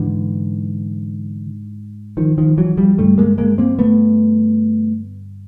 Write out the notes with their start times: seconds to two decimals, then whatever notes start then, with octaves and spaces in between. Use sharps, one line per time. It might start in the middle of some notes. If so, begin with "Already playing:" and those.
Already playing: G#2 D3 E3
2.17 D#3 F3
2.38 D#3 F3
2.58 E3 F#3
2.77 F3 G3
2.98 G2 D3 G3 A3
3.18 G#3 A#3
3.38 G#3 A#3
3.58 A#3 C4
3.79 A3 B3